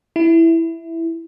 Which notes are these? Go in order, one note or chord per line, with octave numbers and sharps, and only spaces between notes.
E4